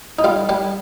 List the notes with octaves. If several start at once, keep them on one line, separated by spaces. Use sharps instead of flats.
D#4
G3 F4
G3 G4